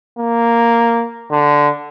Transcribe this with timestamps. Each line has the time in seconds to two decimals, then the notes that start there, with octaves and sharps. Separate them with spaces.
0.18 A#3
1.31 D3